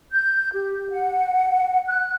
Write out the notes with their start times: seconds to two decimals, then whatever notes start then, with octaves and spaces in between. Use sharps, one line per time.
0.12 G6
0.54 G4
0.91 F#5
1.88 F#6